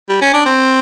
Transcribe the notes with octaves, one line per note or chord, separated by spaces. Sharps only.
G3
C#4
D4
C4